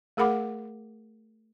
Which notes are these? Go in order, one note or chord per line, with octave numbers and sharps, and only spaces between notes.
A3 G#4 A#4 F#5 B5 D6